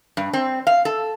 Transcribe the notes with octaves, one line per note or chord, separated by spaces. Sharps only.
G2
C4
F5
A4